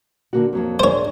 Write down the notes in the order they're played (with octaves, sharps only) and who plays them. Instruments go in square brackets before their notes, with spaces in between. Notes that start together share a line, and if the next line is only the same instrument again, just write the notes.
[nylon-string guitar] D3 A#3 F#4
F2 F#3 A#3
[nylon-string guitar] D4 G#4 A#4 [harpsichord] C5 C#5